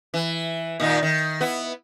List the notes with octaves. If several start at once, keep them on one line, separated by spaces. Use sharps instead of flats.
E3
A#2 D#3 D#4
D#3
B3 E4